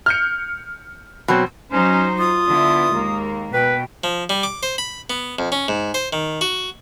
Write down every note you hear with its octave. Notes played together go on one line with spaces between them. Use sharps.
F6 G6 C#7
B2 F#3 C4
F#3 C#4 D#4 C5
F4 D#6
D3 B3 E4
D#2 G#3 A#3
B2 B4 G5
F3
G3
D6
C5
B5
B3
F2
C#4
G#2
C5
D#3
F#4